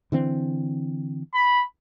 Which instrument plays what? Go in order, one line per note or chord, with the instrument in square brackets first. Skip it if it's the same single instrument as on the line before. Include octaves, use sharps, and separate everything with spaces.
[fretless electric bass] D3 E3 C4
[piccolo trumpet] B5